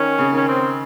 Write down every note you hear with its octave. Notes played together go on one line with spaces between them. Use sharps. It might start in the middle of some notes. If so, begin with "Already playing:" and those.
Already playing: D#3 C#4
C#3
D#3 C#4
C4